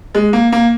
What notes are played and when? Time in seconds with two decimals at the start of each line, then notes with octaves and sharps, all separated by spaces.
0.15 G#3
0.33 A#3
0.52 A#3